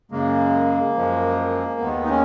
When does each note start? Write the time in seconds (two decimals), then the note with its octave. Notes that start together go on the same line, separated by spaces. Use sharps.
0.11 F#2 C#3 G#3 A#3
0.96 F#2 F3 G#3
1.80 D#2 D#3 G#3 B3
2.04 D#4
2.09 C#4